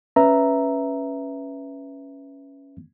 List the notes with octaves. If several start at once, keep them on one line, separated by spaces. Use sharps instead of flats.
C#4 B4 E5 A#5